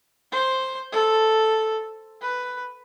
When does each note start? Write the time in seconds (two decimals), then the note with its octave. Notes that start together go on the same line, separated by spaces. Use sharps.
0.32 C5
0.92 A4
2.22 B4